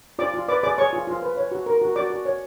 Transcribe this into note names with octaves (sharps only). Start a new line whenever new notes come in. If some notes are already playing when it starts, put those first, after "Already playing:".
F4 D5 D6
F4
B4 D5 D6
G#4 D5 D6
G#4 C#5 C#6
F4
F4
B4
C#5
F#4
A#4
F#4
F#4 D5 D6
F#4
C#5